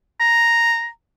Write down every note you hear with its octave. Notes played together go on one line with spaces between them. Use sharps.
A#5